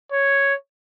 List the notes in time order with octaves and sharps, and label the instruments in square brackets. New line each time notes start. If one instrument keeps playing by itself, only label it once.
[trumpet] C#5